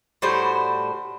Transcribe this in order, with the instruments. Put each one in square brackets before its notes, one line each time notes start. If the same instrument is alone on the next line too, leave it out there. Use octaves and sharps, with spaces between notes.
[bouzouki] A2 G3 F#4 C5